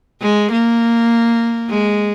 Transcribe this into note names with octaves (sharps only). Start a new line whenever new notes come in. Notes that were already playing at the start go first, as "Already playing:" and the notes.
G#3
A#3
G#3